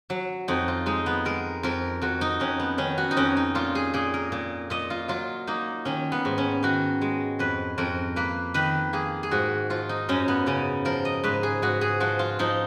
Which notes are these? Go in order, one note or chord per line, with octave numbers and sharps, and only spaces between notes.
F#3
F2 D#4
F4
G#3 D#4
B3
G#3 A#4
F2 A#4
F2 F#4
D#4
F2 C#4
B3
D#3 C#4
F#4
D#4
F2 C#4
D#4
A#2 F4
G#4
A#2 G#4
A#4
A#2
A#2 D#5
F4
F#3 F4
A#3 D#4
D#3 C#4
B3
G#2
C#4
D#3 F#4
G#3
F2 B4
F2 A#4
A#3 B4
D#3 B4
A#3 G#4
G#4
G#2 F#4
F3 F4
D#4
F#2 C#4
B3
C#3 C#4
F3 A#4
D#5
G#2 B4
G#4
G#2 F#4
G#4
F3 F#4
F4
F3 D#4